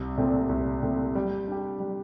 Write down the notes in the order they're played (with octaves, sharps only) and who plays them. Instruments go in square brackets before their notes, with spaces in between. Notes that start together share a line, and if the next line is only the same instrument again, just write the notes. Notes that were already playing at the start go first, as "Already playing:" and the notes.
Already playing: [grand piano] C2
A#2 A3 C4
C2
A#2 A3 C4
G3
D4 G4
G3